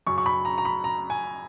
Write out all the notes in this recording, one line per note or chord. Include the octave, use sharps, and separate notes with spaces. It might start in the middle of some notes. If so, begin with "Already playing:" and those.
F#2 C#3 F#3 C#6
C#6
B5
A#5
A#5
B5
A#5
G#5